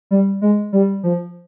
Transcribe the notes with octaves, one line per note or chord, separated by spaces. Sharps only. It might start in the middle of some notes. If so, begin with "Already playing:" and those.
G3
G#3
G3
F3